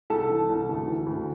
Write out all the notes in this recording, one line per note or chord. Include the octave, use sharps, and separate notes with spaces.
C2 A4 A5
E3
C2
D2
E3
D2